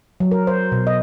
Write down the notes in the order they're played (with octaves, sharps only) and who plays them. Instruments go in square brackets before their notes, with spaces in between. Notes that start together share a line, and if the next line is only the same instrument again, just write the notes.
[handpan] F#3
A#4
C5
B2
D#5